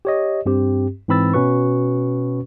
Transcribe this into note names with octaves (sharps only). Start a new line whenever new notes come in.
G4 C#5 D#5
G2 C4 G4
G#2 E3 C4 B5 E6 A6
B2 C#4 F#4 B4 C#6